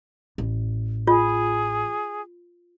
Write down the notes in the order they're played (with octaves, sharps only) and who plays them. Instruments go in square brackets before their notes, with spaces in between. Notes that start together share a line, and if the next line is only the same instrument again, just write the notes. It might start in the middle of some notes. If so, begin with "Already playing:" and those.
[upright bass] A1
[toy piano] F4 [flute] G#4